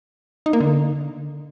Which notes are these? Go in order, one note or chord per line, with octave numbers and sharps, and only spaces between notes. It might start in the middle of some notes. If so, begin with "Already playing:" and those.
D#4
A#3
D3